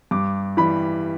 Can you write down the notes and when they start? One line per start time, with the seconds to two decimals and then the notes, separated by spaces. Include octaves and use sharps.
0.11 G2 D6
0.57 E3 G3 B5